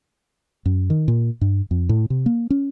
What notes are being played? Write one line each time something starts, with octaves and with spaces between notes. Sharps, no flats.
F#2
D#3
A#2
G2
F2
A2
C3
A#3
C#4